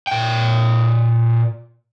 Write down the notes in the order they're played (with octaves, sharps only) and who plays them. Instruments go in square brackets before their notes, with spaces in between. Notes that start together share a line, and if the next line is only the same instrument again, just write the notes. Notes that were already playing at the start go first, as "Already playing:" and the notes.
[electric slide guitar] A#2 G5